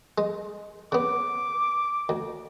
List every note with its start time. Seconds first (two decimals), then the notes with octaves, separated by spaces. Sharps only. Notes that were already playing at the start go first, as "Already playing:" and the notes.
0.18 G#3
0.92 C#3 B3 D6
2.09 D2